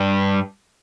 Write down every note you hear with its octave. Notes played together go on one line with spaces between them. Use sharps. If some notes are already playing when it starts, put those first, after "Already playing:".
Already playing: G2